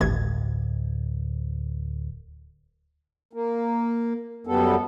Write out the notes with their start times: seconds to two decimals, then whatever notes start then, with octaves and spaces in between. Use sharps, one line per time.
0.01 D1 G#1 G2 G#6
3.33 A#3
4.47 F#2 G3 B3 A4